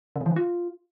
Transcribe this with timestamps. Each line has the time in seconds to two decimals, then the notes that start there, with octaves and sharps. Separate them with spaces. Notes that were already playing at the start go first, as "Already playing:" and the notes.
0.16 C#3
0.21 C3
0.26 E3
0.31 D#3
0.36 F4